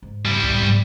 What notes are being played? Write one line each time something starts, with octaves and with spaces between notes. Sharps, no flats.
G#2
G3 E4
C#2 A2
G#2 B3